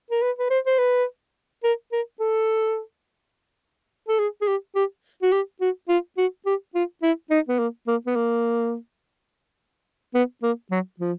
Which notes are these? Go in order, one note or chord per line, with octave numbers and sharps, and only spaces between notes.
A#4
B4
B4
C5
C5
B4
A#4
A#4
A4
A4
G#4
G#4
G4
G4
F#4
G4
F#4
F4
F#4
G4
F4
E4
D#4
B3
A#3
A#3
B3
A#3
B3
A#3
F#3
F3